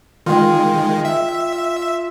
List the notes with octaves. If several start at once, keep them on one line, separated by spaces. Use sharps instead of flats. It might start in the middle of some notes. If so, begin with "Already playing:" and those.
D#3 G#3 F4 G5
E5